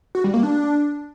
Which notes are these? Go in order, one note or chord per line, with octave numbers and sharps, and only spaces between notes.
F#4
G3
A#3
D4